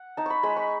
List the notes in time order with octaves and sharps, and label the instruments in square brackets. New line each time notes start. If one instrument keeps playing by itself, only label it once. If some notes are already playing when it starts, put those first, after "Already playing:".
Already playing: [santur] F#5
D#4 A5
B5 C#6
G#3 B5
C#6